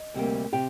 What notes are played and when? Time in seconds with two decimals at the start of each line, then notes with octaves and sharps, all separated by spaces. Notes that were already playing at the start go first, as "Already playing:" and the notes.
Already playing: D#5
0.14 D2 C3 G3 A#3
0.53 C3 G4 G5